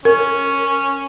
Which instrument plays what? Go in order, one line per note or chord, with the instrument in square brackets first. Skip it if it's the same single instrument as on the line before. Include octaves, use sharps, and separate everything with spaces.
[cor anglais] C#4 [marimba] A#4